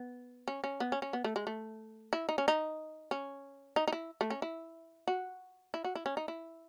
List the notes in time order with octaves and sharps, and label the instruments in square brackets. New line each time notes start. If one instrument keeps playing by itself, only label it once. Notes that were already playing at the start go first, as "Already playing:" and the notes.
Already playing: [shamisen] B3
C#4
C#4
B3
C#4
C#4
B3
A3
G#3
A3
E4
D#4
C#4
D#4
C#4
D#4
D#4
E4
A3
C#4
E4
F#4
E4
F#4
E4
C#4
D#4
E4